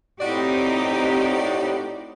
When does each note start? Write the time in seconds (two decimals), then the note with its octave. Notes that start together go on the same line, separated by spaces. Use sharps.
0.21 A2 C4 D#4 F#4 G4 D5